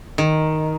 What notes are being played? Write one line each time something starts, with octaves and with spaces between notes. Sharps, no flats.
D#3